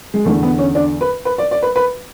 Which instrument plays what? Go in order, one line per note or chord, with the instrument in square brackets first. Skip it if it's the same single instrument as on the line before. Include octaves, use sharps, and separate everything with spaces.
[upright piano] G#3
E2 D3 A3
B3
C#4
D4
B4
B4
D5
D5
B4
B4